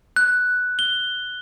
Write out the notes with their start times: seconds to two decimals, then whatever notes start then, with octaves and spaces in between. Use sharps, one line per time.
0.16 F#6
0.79 G7